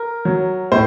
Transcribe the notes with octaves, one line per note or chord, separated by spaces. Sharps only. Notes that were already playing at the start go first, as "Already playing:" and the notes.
Already playing: A#4
F#3
A2 C5